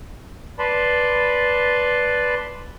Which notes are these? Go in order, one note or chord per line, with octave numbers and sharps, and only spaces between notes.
B4 D5 A5 B5 C6